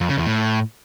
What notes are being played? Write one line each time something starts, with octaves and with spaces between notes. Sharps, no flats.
F2
C#3
E2
A2